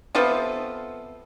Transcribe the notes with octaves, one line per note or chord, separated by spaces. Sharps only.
C3 F3 B3 F4 A4